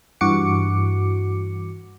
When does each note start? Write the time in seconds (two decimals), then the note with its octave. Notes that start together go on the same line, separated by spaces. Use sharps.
0.21 G2 E3 F#4 D6 C#7